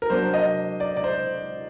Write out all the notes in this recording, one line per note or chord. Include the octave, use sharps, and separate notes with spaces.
A#4
F#3 A#3 D4 C5
D#5
D5
D5
C5